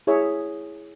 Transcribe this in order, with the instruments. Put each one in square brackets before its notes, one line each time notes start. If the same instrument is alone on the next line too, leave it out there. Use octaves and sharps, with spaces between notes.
[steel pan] E4 G#4 C#5 E5